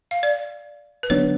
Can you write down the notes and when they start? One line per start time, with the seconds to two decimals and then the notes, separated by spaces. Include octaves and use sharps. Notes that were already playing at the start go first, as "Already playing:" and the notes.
0.11 F5
0.23 D5
1.03 B4
1.10 D3 F#3 B3 D4 C#5